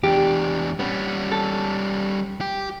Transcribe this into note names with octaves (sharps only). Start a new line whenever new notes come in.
E2 D4 G4
G3 B3 C#4
A4
G4